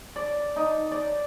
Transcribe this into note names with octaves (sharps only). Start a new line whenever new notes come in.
D5
D#4
D5